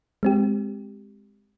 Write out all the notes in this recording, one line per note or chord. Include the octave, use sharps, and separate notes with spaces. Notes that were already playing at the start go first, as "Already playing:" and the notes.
G#3 C4 G4